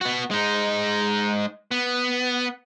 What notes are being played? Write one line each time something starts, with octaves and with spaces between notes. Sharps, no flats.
B3 F#4
G#3 D#4
B3